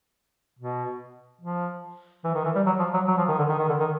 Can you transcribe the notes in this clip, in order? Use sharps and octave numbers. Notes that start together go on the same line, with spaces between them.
B2
F3
E3
D#3
E3
G3
F#3
F3
F#3
F#3
F3
D#3
D3
D#3
D#3
D3
D#3